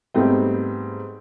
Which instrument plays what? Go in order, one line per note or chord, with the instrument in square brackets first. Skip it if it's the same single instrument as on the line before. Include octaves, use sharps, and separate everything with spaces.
[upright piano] G#2 G3 A3 B3 C4